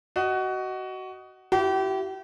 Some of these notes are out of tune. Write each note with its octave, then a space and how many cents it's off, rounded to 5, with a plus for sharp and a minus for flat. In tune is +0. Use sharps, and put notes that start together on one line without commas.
F#4 +20 D#5 +0
E4 +30 G4 -35